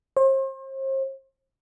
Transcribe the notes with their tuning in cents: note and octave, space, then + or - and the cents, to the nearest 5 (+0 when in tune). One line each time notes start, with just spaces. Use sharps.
C5 +40